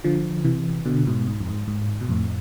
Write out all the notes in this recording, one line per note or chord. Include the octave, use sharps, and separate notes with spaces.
D3 F3
C3 E3
B2 D3
G#2 B2
G#2
F2
G#2
G#2
B2
F2 A2